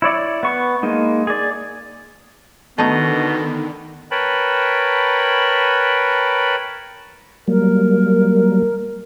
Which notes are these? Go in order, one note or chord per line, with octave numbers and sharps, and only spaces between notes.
E4 C#5 D5
B3 C#6
G#3 A#3 D#4
G#4 D5
B2 D3 D#3 A3 B3 D#4
A#4 B4 C#5 G5 A5 B5
F#3 G3 A#3 A#4